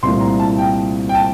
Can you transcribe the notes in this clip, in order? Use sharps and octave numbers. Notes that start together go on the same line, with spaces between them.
C2 A#2 A3 C4 E4 C6
A#5
A5
G5
G5
A5